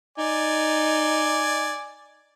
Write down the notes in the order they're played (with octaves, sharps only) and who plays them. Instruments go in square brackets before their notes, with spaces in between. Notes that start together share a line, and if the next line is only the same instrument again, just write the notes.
[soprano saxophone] D#4 [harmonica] D5 G#5